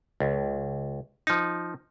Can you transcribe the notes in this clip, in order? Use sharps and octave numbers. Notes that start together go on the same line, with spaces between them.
C#2
F3 D#4